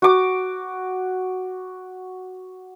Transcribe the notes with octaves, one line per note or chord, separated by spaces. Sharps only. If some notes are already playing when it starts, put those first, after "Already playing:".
F#4 D6